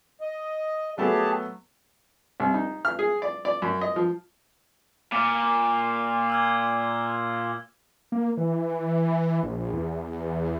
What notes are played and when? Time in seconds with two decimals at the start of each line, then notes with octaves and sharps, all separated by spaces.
0.21 D#5
0.98 F#3 A3 B3 G4 G#4 A5
2.40 C2
2.54 D#4
2.85 F6
2.99 G#4
3.22 D5
3.45 D5
3.62 F#2
3.81 D#5
3.96 F3
5.12 A#2 D6 F6
6.30 E6 F6 G#6
8.12 A#3
8.37 E3
9.43 A#1
9.73 E2